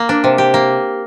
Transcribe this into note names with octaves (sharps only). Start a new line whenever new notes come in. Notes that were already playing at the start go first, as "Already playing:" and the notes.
Already playing: A#3
D4
C3
G4
A#3